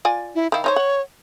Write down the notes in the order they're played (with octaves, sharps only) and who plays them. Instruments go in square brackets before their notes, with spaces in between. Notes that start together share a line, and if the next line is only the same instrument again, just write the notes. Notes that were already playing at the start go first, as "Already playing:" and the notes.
[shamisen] F4 D5 G#5
[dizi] E4
[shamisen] D#3 E4 [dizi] F5
[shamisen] D#4 F4 C5 [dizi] C#5
[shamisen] F#5